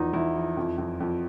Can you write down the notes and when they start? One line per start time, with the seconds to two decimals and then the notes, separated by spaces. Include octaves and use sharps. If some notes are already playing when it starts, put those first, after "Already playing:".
Already playing: E2 F3 D#4
0.13 E2 E4
0.34 F3
0.57 F2
0.78 F2
1.00 F2